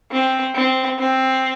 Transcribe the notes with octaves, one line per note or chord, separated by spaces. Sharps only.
C4
C4
C4